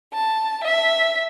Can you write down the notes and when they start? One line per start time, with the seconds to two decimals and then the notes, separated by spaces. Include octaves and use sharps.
0.13 A5
0.64 E5